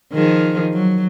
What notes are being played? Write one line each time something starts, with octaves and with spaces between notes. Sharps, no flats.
D#3 F3 G#4
F#3